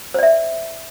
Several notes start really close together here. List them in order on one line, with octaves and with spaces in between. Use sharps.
C5 D5 E5